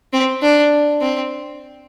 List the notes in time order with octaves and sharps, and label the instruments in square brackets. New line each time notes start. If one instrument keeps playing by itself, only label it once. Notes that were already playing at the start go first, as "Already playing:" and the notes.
[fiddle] C4
D4
C4